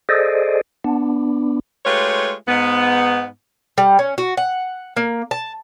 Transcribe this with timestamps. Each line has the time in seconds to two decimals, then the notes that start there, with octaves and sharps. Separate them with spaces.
0.09 G#4 A4 C5 D5 D#5
0.84 B3 D4
1.85 G#3 A3 F4 G4 B4 C#5
2.48 G#2 B3
3.78 G3
3.99 C#4
4.18 F#4
4.37 F#5
4.97 A#3
5.31 A5